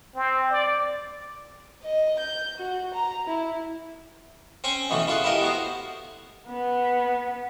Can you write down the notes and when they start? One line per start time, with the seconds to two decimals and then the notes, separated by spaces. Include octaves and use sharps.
0.15 C4
0.51 D5
1.83 D#5
2.19 G6
2.57 F#4
2.94 A#5
3.27 E4
4.64 C4 C#4 G#5 C#6
4.90 B2 E3 A3 C#4
5.07 E4 F4 G#4 A4 B4
5.24 E4 G4 A4 A#4 D#5
5.41 B3 F#4 C5
6.48 B3